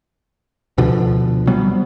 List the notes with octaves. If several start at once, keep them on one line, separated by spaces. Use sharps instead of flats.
D2 B2 D3 F3
C3 F#3 G3 B3